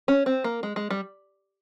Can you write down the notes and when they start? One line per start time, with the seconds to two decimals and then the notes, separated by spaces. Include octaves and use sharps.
0.08 C#4
0.26 C4
0.44 A#3
0.63 G#3
0.76 G#3
0.91 G3